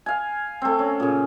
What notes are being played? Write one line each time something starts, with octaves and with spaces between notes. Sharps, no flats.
F5 G#5
A3 C4
C#4
A#2 C#3